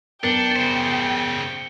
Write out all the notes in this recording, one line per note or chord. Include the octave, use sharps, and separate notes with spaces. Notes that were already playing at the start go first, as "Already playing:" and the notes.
F#2 B3 D4 A#4 G5 C#7 G7
C#3 C5